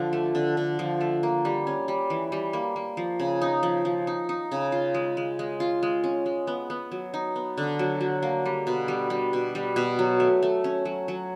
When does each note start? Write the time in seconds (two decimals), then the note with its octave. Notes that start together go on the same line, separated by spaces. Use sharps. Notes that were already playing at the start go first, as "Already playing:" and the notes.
Already playing: D3 F3
0.13 A3
0.35 D3
0.57 D3
0.79 F3
1.01 A3
1.23 A#3
1.45 G3
1.67 C#4
1.88 G3
2.10 E3
2.32 G3
2.53 A#3
2.76 A#3
2.97 F3
3.20 C#3
3.41 D#4
3.63 F3
3.85 F3
4.07 D#4
4.29 D#4
4.52 C#3
4.72 F4
4.94 G#3
5.17 G#3
5.39 G#3
5.60 F4
5.83 G#3
6.04 C#4
6.26 G#3
6.47 B3
6.70 B3
6.92 F#3
7.14 D#4
7.36 B3
7.58 D3
7.79 F#3
8.01 F#3
8.23 A#3
8.46 G3
8.67 B2
8.88 G3
9.10 G3
9.33 B2
9.55 G3
9.76 B2
9.99 F#3
10.20 A3
10.43 A3
10.64 C#4
10.85 F#3
11.08 F#3